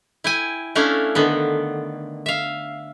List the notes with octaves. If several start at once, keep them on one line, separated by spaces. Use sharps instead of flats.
E4 G5 G#5
A3 C#4 D4 E4 F5
D3 D#3 B3
E5 F5